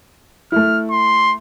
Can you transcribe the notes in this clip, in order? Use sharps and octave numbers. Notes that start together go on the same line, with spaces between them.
A3 E4 F6
C6